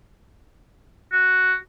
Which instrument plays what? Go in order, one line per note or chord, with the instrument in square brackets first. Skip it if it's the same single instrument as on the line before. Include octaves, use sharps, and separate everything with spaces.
[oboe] F#4